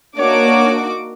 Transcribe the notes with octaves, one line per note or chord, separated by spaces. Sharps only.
A#3 D4 D#4 F#4 C#5 D6